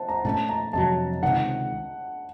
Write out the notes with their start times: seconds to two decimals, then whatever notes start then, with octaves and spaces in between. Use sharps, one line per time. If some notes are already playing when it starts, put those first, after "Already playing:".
Already playing: C5 F#5 A5
0.09 A#5
0.25 A#2 A3 C#4 A5
0.49 A#5
0.73 F2 C3 F#3 A5
1.23 C#2 C3 D#3 F#5